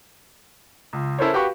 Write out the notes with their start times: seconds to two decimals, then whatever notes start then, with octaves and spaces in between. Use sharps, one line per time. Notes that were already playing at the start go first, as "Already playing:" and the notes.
0.93 C#2
1.18 C#4 E4 A4 A#4 C5 C#5
1.33 F#4 G4 B4 F5 C#6